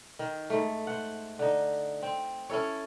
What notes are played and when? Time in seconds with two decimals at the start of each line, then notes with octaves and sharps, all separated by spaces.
0.19 D#3
0.50 G#2 A3
0.87 C5 F#5
1.39 D3 D#4
2.03 C4
2.49 C#4 E4 A4 C#5